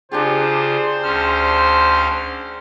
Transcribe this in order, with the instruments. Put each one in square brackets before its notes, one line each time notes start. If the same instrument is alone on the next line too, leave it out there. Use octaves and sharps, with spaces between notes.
[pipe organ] C#3 F4 [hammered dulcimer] D4 G4 G#4 [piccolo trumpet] C5
[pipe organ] D2 C#4 F6